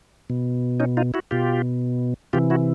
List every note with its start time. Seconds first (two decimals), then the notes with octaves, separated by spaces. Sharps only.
0.30 B2
0.80 C#4 D#4
0.97 D#4 F4
1.14 E4 F#4
1.31 B2 F4 G4
2.33 C3 E3 F4 G4
2.50 E4 F#4